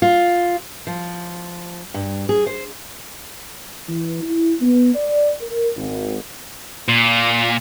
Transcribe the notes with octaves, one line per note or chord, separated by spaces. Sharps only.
F4
F3
G2
G#4
C5
E3
E4
B3
D5
A#4
G#1
A#2